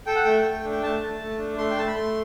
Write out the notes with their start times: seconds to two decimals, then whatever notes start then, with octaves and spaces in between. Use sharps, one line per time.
0.06 A4 G5
0.16 F#5
0.25 A3 G5
0.44 A3
0.64 D4
0.71 G5
0.83 A3 A5
1.01 A3
1.19 A3
1.38 D4
1.57 A3 C6
1.70 G5
1.76 A3 A5
1.87 B5
1.95 A3 C6